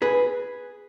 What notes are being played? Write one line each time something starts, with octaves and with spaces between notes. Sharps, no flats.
G#4 B4